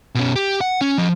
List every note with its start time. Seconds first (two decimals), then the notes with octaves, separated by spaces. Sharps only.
0.15 B2 C#4
0.36 G4
0.61 F#5
0.81 C#4
0.98 F3 D#5